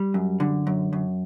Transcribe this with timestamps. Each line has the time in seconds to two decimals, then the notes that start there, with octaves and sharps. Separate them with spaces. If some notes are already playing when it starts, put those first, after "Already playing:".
Already playing: G3
0.14 F#2
0.40 D3
0.67 F#2
0.93 F#2